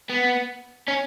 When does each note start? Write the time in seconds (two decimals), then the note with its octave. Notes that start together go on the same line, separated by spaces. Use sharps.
0.10 B3
0.88 C#4